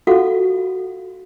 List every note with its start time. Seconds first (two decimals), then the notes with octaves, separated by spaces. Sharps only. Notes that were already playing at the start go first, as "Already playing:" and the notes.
0.07 F4 F#4 A4 F5 F#5